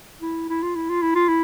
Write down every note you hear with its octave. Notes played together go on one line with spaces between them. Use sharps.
E4
E4
F4
E4
F4
E4
F4
E4